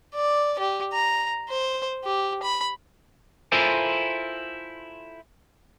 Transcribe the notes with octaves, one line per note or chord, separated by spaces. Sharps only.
D5
G4
A#5
C5
G4
B5
E4 F4 A4 A#4 C5 G#5